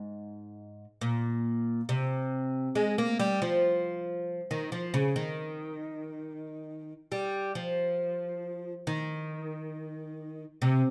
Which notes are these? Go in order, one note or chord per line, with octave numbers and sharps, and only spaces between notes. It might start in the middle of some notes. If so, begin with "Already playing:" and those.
Already playing: G#2
A#2
C3
G#3
A#3
G3
F3
D#3
F3
C#3
D#3
G3
F3
D#3
C3